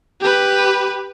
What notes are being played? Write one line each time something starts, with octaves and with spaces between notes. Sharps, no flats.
G4 B4